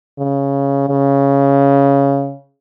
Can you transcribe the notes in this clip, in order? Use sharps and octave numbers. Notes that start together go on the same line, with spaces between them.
C#3
C#3